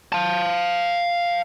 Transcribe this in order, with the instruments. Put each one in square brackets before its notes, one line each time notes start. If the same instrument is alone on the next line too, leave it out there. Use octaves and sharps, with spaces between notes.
[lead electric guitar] F5 A5